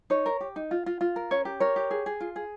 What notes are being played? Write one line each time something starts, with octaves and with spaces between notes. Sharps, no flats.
D#4 C#5
A#4
G4
D#4
F4
F4
F4
A#4
C#4 C#5
G4
A#4 C#5
G4
G#4
G#4
F4
G#4